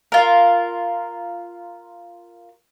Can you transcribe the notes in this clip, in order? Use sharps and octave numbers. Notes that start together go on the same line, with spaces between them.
F4 A#4